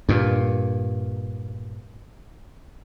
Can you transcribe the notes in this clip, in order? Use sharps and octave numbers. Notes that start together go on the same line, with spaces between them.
G2 A#2